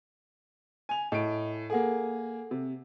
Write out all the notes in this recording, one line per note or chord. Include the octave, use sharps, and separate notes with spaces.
G#5 F7
A2 D#5 D7
A#3 G#4 A4 F#5
C3